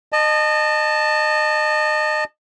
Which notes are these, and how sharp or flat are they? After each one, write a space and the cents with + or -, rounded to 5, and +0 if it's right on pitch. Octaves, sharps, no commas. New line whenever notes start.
D#5 -30 A5 +0